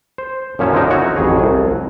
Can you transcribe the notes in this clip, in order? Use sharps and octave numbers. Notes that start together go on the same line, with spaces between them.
C5
F#2 A#2 F3 C#4 E4 A5
D3 F3 F#3 D#4 A#4
D#4 E4 F#4 C#5
A1 F2 F#3 G#4
C2